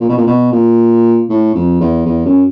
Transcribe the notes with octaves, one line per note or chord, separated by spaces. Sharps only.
A#2
B2
A#2
B2
A#2
A2
F2
E2
E2
F#2